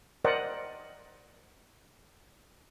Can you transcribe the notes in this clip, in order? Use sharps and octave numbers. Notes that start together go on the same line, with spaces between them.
A#4 C5 D5 D#5 F#5 G5